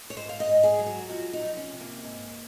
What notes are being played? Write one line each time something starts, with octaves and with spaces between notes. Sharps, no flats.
C#5
G#2 C5
F5
D#5
G#2
G#4
F#3
F#4
F3 F#4
D#4
F3
C#4
C3
A#3
G#2